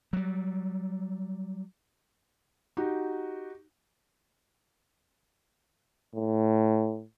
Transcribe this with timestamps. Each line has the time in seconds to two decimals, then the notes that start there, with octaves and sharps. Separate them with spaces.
0.13 F#3 G3
2.77 D#4 F#4 G4
6.15 A2